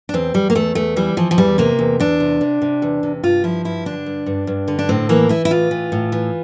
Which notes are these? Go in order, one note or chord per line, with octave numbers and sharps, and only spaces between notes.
D4
E2 C4
E2 G3
A#3
E2 A3
E2 A3
E3 G3
E3 F3
F3
E2 G3
C3 A#3
E2
E2 D4
C3
C3
C3
E2
C3
G2 F4
F3 E4
G2 E4
D3 D4
G2
G2
G2
D3
D4
A2 C4
E3 A#3
E3 E4
E4
A2 F4
E3
A2
E3